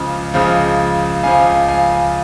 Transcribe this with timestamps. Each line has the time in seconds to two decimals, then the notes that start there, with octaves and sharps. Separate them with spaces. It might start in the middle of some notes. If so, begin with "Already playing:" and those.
Already playing: C#2 C#3 F3
0.34 C#2 C#3 F3
1.23 C#2 C#3 F3 F5 G#5
1.69 F5 G#5